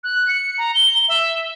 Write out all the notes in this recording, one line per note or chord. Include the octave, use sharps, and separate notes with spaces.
F#6
C#7
A#5
G7
E5